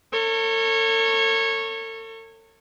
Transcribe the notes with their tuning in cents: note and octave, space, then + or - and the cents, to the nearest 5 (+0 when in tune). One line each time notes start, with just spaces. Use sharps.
A4 +40 C#5 -15